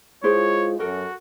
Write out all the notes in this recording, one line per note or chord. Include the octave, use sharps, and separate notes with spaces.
G#3 E4 F4 G#4 C5 C#5
F#2 F#4 A4 A#4